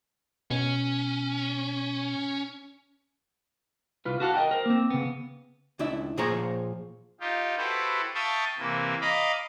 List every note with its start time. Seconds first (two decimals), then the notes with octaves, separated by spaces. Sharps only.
0.51 B2 C#4
4.05 C2 F4 B4
4.20 F#4 G4 A4 F5 F#5
4.35 A#4 B4 D#5 G5
4.51 A#4 C5
4.66 A#3 C4
4.90 C#3 B3
5.79 C#2 D4 E4 E5
6.18 A#2 F3 G#4 C5 C#5 A#5
7.20 D#4 F4 G4
7.57 E4 F#4 G4 A4 B4 C5
8.15 E5 F5 G5 A5 C#6 D#6
8.58 C3 E3 A#3
9.01 D#5 F5 A#5 B5 D6